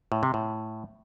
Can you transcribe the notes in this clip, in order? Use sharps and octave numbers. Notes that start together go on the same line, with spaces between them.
A2
C3
A2